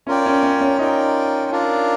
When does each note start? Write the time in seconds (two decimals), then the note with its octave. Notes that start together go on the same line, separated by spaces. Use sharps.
0.07 C#4 F4 A#4 D5 G5
0.26 C#4
0.43 C#4
0.61 C#4
0.79 D#4 F4 A#4 D5 G5
1.51 D4 F4 A#4 D5